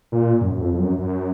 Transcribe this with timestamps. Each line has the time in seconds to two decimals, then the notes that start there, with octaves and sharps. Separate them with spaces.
0.12 A#2
0.41 F#2
0.52 F#2
0.60 F2
0.73 F2
0.79 F#2
0.99 F#2